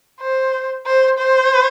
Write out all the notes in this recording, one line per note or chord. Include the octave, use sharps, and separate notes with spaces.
C5
C5
C5